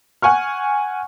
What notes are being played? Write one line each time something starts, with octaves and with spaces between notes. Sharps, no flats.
F#5 G#5 C#6 F6